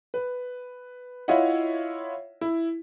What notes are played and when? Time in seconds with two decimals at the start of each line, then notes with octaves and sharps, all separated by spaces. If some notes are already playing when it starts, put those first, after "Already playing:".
0.14 B4
1.28 E4 F4 C#5 D#5 E5 F#5
2.41 E4